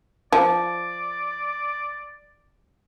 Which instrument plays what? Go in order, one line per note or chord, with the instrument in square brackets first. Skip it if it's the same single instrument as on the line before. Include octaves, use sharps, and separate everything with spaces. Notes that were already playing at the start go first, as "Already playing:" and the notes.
[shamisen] F3 [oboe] D5